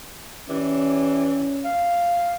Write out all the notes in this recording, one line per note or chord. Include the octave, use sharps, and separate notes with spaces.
E3 C#4 G4 D5
F5